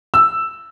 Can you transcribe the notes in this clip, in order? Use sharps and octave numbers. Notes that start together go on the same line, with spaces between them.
E6